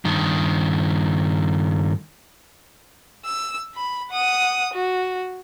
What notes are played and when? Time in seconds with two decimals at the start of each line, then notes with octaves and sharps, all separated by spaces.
0.05 G2 D#3
3.25 E6
3.75 B5
4.11 F#5 D#6
4.74 F#4